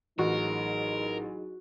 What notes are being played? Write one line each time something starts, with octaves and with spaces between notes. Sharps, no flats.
A1 F#3 D#4 F#4 G#4 A#4